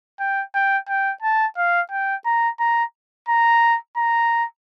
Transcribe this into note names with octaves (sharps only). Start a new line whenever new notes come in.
G5
G5
G5
A5
F5
G5
A#5
A#5
A#5
A#5